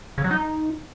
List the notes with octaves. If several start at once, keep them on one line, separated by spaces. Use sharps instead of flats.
C#3
F#3
D#4